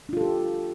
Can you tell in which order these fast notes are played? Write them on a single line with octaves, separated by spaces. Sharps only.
D4 F4 A4 G4